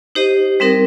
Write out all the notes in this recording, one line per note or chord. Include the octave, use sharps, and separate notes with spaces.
D#4 G4 C5 D#5
G3 C4 D#4 A#4